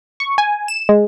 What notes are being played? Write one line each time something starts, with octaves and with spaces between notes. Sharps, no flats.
C#6
G#5
E7
G#3